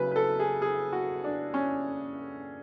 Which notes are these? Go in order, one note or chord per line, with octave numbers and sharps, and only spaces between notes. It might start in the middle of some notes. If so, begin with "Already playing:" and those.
Already playing: C#3 F#3 B4
B4
A4
G#4
G#4
F#4
D4
C#4